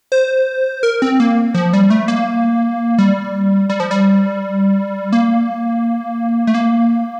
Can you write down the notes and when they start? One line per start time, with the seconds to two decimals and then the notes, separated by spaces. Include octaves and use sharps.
0.12 C5
0.83 A#4
1.02 C4
1.20 A#3
1.54 F3
1.73 G3
1.90 A3
2.08 A#3
2.98 G3
3.70 G3
3.80 F3
3.91 G3
5.13 A#3
6.47 A3
6.55 A#3